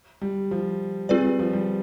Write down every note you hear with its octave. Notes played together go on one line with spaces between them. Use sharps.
G3
F3
G3 C4 F4 G#4 B4 D5
G3
F3
G3